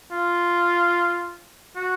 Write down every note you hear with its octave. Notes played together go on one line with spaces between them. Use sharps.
F4
F#4